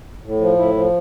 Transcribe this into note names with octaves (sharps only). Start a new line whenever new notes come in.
A2
F3
A2 E4
F3